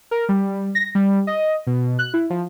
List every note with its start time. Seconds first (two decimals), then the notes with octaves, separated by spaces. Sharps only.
0.11 A#4
0.29 G3
0.75 A#6
0.95 G3
1.27 D#5
1.67 B2
1.99 F#6
2.14 E4
2.30 F3